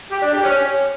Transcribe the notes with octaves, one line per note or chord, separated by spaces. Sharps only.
G4
D4
G4
C#4